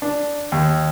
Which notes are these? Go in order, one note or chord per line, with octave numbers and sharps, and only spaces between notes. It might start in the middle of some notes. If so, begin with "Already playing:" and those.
D4
D#2